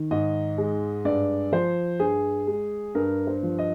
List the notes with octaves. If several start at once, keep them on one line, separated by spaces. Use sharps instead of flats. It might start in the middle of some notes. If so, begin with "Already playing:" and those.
Already playing: D#3
G#2 D#5
G#3
G2 D5
F3 C5
G2 G#4
G#3
G2 A#4
C5
F3
D#5